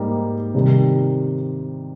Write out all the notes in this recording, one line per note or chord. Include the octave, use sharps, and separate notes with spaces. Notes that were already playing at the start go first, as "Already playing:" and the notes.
Already playing: G#2 G3 A#3 D#4
C3 D#3 G3